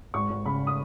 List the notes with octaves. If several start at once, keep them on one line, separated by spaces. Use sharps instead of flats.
G#1 C#6
G#1
C#3 B5
D#6